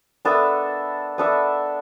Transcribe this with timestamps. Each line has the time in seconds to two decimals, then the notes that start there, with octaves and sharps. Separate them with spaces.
0.25 B3 D4 A4 E5
1.18 B3 D4 A4 E5